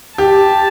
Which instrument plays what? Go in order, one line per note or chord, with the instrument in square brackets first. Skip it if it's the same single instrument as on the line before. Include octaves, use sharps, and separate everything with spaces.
[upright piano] G4 [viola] A5